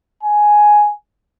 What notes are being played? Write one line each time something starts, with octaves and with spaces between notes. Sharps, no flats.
G#5